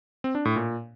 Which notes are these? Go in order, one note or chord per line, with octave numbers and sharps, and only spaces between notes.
C4
D4
A2
A#2